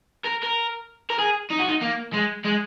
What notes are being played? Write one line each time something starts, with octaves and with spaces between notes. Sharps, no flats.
A#4
A#4
A#4
G#4
D#4
F#4
D#4
A#3
G#3
G#3